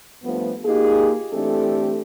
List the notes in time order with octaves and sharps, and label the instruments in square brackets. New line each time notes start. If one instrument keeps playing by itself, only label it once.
[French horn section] G2 F3 A3 B3
A#3 D#4 F4 G4 G#4
E3 A3 C4 D4 G4 A4